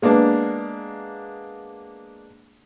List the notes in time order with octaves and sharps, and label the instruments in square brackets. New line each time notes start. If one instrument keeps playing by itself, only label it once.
[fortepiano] G#3 A#3 B3 D4